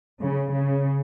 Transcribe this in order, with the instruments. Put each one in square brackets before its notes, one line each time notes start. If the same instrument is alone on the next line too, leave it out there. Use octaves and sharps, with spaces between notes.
[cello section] C#3
C#3